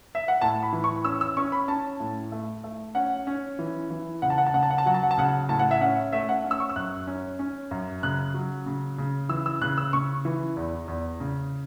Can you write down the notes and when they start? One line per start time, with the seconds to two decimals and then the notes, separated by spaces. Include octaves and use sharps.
0.15 E5
0.28 F#5
0.41 A2 A5
0.63 B5
0.73 E3
0.84 C#6
1.05 C#4 E6
1.21 E6
1.37 C#4 C#6
1.52 B5
1.68 C#4 A5
2.00 A2
2.32 A3
2.64 A3
2.95 C#4 F#5
3.27 C#4
3.59 E3
3.90 E3
4.22 C#3 F#5
4.30 A5
4.38 F#5
4.46 A5
4.54 C#3 F#5
4.63 A5
4.71 F#5
4.78 A5
4.86 F#3 F#5
4.94 A5
5.03 F#5
5.11 A5
5.17 C#3 F#5
5.49 A2 A5
5.59 F#5
5.71 E5
5.81 C#4 F#5
6.12 A3 E5
6.29 F#5
6.44 C#4
6.51 E6
6.60 C#6
6.69 E6
6.76 F#2 F#6
7.07 C#4
7.39 C#4
7.71 F#2
8.03 C#3 F#6
8.34 F#3
8.66 C#3
8.98 C#3
9.29 E3 E6
9.46 E6
9.62 C#3 F#6
9.78 E6
9.93 C#3 C#6
10.25 E3
10.57 E2
10.88 E2
11.20 C#3